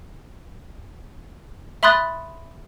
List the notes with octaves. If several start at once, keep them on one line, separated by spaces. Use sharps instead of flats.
E5 B5 C6 D#6 F#6 A6